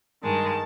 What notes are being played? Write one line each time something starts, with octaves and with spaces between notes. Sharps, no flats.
G2 D#3 G#3 A5